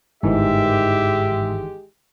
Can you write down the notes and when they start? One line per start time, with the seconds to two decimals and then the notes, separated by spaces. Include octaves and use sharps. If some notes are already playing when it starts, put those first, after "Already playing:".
0.23 G1 G#2 D#3 E3 G#3 G4 E5